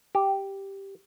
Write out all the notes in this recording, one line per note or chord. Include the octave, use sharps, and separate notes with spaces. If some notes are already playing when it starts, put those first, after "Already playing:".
G4